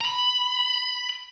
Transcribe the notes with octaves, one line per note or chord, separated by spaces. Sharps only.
A#5 B5